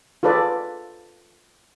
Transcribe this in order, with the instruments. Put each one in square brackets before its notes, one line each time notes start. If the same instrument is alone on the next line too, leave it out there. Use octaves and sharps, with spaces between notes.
[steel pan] F4 G#4 A4 B4 D5